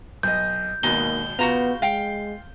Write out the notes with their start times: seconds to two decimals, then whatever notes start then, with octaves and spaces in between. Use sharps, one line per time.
0.23 B1 D#5 G6
0.83 G#1 D#2 B2 A#3 D#4 G7
1.39 C#3 B3 F4 F#4 A#5
1.82 G#3 F5 G5